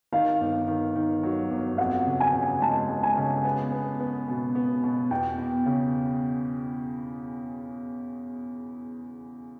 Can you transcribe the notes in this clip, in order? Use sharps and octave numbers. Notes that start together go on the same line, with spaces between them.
D#3 F5
G1
D#3
D#3
F#3
G1
F2 F#5
C#3
G#5
C#3
G#3 A5
G#3
G#5
C#3
B3
B3
B3
B2
B3
B2
E2 G5
E2
C#3